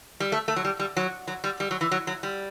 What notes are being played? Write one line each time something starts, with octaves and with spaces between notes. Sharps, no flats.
G3
A3
A3
F#3
G3
G3
F#3
F#3
G3
G3
F#3
E3
F#3
F#3
G3